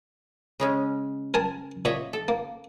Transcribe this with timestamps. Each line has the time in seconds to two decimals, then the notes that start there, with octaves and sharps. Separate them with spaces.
0.60 C#3 G#3 C#4
1.34 A#4 G#5 A5
1.85 A#2 C#5 D#5 E5
2.13 A4
2.28 A#3